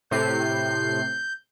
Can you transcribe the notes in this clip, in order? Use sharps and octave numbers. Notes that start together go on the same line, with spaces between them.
A2 C3 G6 C7